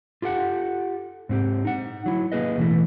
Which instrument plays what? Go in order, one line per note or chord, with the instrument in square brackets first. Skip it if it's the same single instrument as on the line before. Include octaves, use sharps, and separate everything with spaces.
[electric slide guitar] F4 G4 A4 F#5
G#2 C4 G4
D#4 F#5
F#3 E4
A#3 G#4 B4 D#5
B2 E3 A3 E4